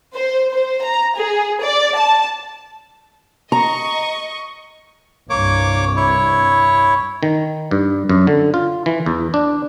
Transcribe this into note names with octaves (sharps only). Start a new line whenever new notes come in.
C5
C5
A#5
G#4
D5
A5
D#5 A#5 C#6
C2 G2 A#3 C#5 D6
E4 C#5
D#3
G2
F#2
D3
F4
E3
E2
D4